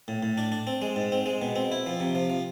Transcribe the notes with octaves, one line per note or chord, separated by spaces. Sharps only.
A2
A2
D4
D4
C4
G#3
G#2
C4
G#3
B2
C4
E4
F3
C3
F3
F3